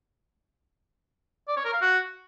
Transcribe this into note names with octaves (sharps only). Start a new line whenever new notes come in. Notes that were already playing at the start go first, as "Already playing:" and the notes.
D5
C#5
A#4
F5
F#4